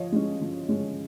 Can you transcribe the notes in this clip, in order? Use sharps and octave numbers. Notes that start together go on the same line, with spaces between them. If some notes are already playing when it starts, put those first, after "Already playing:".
Already playing: F3 C#5 D#5
G#3 C#4
F3
G#3 C#4